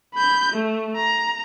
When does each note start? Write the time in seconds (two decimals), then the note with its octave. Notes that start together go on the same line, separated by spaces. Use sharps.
0.14 B5 G6
0.52 A3
0.96 A#5